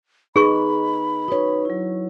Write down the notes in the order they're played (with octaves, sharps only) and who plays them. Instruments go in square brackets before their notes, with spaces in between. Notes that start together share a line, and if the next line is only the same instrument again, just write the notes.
[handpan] D#4 B4 [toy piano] G#4 C#6 [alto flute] B5
[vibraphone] D#4 B4 [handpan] F#4 C#5
[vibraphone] F#3 E4